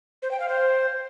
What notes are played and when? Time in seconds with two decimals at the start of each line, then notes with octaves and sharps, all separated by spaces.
0.22 C5
0.31 G5
0.40 F5
0.49 C5